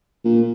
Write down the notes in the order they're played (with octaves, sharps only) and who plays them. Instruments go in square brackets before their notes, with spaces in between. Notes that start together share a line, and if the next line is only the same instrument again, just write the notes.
[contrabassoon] A#2